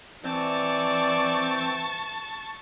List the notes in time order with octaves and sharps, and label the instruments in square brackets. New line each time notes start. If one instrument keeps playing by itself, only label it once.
[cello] E3 [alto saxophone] C4 [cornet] D5 [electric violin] A5 C#6